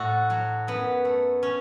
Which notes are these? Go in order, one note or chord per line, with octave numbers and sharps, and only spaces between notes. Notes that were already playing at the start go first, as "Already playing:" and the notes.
Already playing: A2 A3 F#4 A4
F#3
F#2 B3
A3
C#4